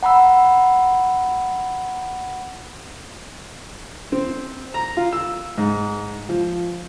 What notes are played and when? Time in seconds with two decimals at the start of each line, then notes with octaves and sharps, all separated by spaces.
0.03 F#5 A#5 B5 E6
4.12 C4
4.74 A#5
4.97 F4
5.13 E6
5.58 G#2
6.29 F3